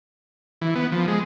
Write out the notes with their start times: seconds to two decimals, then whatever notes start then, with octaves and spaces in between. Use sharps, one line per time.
0.61 E3
0.75 B3
0.92 F3
1.08 G#3